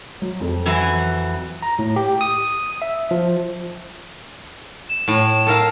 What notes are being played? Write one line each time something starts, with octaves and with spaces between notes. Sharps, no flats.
F#3
F2 A4
E3 F#3 E4
A#5
A2
G4
D#6
E5
F3
E7
A2
A4 A#4 F5